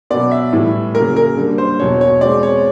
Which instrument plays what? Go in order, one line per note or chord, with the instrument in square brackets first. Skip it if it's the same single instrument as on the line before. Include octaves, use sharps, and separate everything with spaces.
[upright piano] B2 F#3 B3 D5
E5
A2 E3 G3
C#3 F#3 A#3 A#4
A#4
D3 G3 A#3
C5
E2 B2 F#3 C#5
C#5
B2 G#3 C4 D5
C#5